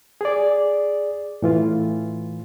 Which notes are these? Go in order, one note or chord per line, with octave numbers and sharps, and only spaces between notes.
G#4 D5
A2 E3 F4